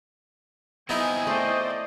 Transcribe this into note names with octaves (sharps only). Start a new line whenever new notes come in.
B3 C4 D#4 E4 G#4 G#5
A3 C5 D5 D#5